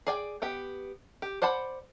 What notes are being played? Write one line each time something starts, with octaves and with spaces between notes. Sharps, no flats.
G#4 D5 G5
B3 G4 G5
G4
C5 D5 F#5 A5 B5